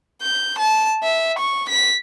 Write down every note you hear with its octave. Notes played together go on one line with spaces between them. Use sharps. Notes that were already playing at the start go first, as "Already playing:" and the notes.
G6
A5
E5
C#6
B6